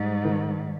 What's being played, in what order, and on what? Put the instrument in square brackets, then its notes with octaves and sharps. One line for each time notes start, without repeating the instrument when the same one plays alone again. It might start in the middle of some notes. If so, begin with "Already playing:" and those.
Already playing: [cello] G#2 [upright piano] G3
[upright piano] D#3